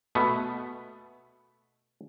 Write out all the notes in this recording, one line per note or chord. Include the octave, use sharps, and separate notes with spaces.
B2 A3 B3